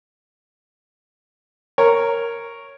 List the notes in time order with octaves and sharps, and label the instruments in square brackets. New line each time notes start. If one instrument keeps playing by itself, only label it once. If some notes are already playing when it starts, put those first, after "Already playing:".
[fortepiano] A#4 C#5